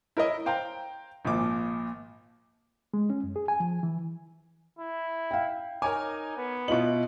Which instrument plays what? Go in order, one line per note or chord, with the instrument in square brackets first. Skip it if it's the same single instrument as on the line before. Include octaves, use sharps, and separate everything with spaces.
[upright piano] E4 A#4 C#5 D#5
C5 F5 G5 A#5
G#1 A#2 F3 D6
[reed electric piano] G#3
C#4
F#2
G#4
G#5
F3
E3
[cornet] E4
[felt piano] F5 G5
[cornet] D#4 [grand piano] A#4 C#5 G#5 [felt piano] D6
[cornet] B3
[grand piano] B2 F#7 [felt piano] E4 F4 D#5